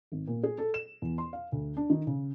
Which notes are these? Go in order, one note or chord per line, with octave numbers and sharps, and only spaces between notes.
G#1
A#2
G#4
A4
E7
E2
C6
F5
D2
D4
D#3
C#3